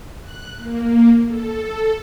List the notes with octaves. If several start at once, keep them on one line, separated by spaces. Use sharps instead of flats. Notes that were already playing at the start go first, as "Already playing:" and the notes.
F#6
A#3
A4